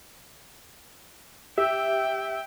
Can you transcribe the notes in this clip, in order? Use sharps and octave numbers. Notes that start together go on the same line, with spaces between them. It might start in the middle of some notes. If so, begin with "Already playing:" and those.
G4 E5 G5